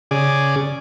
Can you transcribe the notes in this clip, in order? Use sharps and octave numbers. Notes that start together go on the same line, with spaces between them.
C#3 G#4 D5